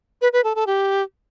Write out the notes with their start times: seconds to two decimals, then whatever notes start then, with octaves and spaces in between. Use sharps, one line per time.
0.22 B4
0.33 B4
0.44 A4
0.55 A4
0.67 G4